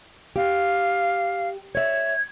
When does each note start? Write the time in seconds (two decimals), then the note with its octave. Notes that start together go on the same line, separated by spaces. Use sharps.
0.36 G4 F5
1.75 C#5 E5 G#6